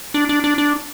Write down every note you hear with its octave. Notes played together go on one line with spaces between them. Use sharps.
D4
D4
D4
D4